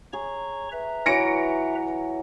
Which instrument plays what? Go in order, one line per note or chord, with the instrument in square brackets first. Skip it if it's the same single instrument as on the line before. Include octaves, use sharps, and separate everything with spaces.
[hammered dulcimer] G#4 [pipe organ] C#5 A#5 C#6
[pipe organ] B4 E5 A#5
[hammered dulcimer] E3 F#3 [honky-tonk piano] A#6 C#7 D7